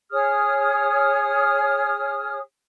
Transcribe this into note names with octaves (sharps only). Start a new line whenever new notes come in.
G#4 C#5 D#6 F6